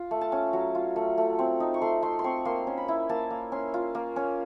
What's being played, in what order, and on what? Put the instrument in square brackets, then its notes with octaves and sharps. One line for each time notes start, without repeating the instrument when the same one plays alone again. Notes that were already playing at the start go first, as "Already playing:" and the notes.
Already playing: [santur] F4
A3
A5
C#4
F#3
F4
A3
A3
C4
D#4
C#6
A3 C6
A3 C6
C6
C4 C#6
A#3 C6
C#4
B5
E4
A#3 A5
A#3
C#4 C6
F4
A#3
C#4